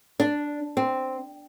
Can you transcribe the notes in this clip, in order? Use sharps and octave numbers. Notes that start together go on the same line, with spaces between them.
D4
C4